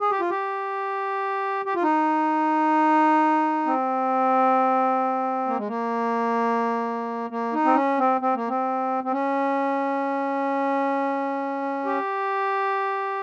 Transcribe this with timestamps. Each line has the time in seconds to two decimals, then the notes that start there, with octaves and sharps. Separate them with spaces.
0.01 G#4
0.11 G4
0.20 F4
0.30 G4
1.66 G4
1.75 F4
1.82 D#4
3.66 C4
5.47 A#3
5.58 G#3
5.68 A#3
7.30 A#3
7.53 D#4
7.65 C4
7.75 C#4
7.99 C4
8.21 C4
8.35 A#3
8.48 C4
9.04 C4
9.12 C#4
11.85 G4